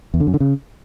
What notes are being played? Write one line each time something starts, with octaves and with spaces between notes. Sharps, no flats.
E2
D3
F#2
D3
C#3